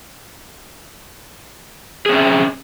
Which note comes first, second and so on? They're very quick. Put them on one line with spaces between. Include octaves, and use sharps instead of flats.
G#4 C4 C#4 E5